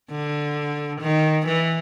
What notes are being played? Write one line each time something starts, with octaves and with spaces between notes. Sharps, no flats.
D3
D#3
E3